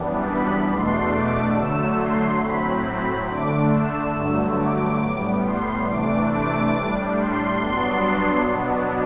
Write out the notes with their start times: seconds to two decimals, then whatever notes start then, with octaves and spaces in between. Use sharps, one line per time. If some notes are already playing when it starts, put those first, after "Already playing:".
Already playing: F#2 E3 G3 B3 D4
0.27 B5
0.70 E2 B2 A3 D4 C6
1.13 D6
1.56 D3 F#3 A3 E6
1.99 C6
2.42 A2 F#3 C4 B5
2.86 B5
3.29 D3 A3 D4 D6
3.72 E6
4.15 G2 D3 F#3 A3
4.58 D6
5.01 A2 G3 B3
5.44 C6
5.87 C3 E3 A3 D4 D6
6.31 D6
6.74 A2 G3 D4
7.17 C6
7.60 G2 F#3 B3 D4
8.46 B2 F#3 B3 D4